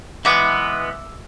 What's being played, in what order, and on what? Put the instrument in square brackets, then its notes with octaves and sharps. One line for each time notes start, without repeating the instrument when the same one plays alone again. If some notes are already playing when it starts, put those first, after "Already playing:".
[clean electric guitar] E3 G#3 B3 [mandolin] E5 D6